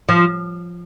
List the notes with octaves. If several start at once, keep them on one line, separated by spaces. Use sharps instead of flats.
F3